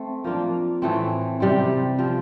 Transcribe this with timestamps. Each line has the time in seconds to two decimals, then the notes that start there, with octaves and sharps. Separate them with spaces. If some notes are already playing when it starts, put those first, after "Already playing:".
Already playing: A3 C4
0.24 F3 A#3 D4 F4
0.82 A2 E3 A3 C4
1.40 C3 G3 C4
1.99 F3 C4